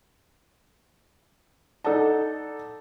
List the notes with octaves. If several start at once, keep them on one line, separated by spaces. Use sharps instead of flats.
D#4 A4 D5 F#5 A5